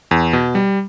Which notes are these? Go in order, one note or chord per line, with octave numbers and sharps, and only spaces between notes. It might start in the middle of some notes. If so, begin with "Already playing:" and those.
E2
B2
G3